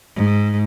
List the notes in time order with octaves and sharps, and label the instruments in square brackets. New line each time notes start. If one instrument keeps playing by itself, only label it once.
[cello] G#2